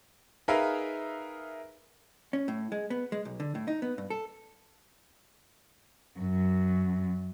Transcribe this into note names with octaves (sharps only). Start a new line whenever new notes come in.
D#4 G#4 A#4 B4 E5 F5
C#4
A2
G#3
B3
G#3
B1
D3
A2
D#4
B3
G2
A4
F#2